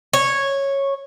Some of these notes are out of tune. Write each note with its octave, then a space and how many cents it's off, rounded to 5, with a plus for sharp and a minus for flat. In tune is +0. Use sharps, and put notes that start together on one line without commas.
C#5 -10